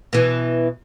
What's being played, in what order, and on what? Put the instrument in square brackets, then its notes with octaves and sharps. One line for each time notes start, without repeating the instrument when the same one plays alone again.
[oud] B2 E3